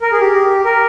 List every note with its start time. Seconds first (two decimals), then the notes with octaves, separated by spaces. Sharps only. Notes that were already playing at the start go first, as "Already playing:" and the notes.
0.02 A#4
0.12 G#4
0.20 G4
0.65 A#4